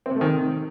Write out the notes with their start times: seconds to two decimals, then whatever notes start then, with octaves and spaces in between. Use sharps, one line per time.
0.06 C4
0.11 C3
0.16 A3
0.21 D#3
0.26 C3